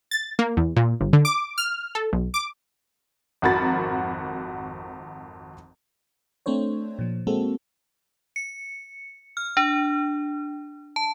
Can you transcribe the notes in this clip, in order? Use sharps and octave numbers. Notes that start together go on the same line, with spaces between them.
A6
A#3
E2
A#2
G1
D3
D6
F6
A4
B1
D6
G#1 F2 F#4 A#4 B5 A6
A3 C4 D4 C5 C#5
A#2 F3
G#3 A#3 C4 F#4 A4
C#7
F6
D4
A5